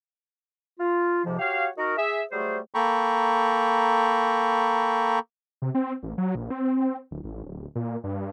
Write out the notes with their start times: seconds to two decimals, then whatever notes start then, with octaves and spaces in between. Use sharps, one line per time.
0.80 F4
1.25 F2 G#2 C3 F3
1.39 F#4 G4 C#5 F5
1.77 D#4 F#4 A#4
1.97 G#4 E5
2.31 F#3 G3 A3 G#4 C5
2.74 A#3 A4 G5 A#5 B5 C#6
5.62 C3
5.74 C4
6.03 A1
6.18 F#3
6.35 A#1
6.50 C4
7.11 D1
7.24 A1
7.43 D1
7.75 A#2
8.04 G2